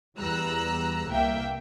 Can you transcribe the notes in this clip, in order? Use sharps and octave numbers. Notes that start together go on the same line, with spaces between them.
E2 G3 A#5 E6 F#6
C2 A#3 E5 G5